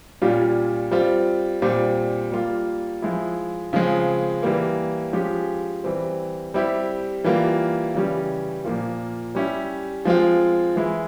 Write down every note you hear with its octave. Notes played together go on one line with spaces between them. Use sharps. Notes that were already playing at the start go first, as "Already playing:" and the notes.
A#2 G3 C#4 F4
G3 C4 F4
A#2 G3 C4
G3 A#3 F4
F3 G#3 E4
C#3 F3 G#3 C4
E3 G3 A#3
F3 G#3 C#4 G4
E3 G3 C4
G3 C4 E4 G4
E3 G3 A#3 F4
C#3 E3 G3 C#4
A#2 F3 A#3 F4
G3 C#4 E4 G4
F3 G#3 C4 F4
E3 G#3 E4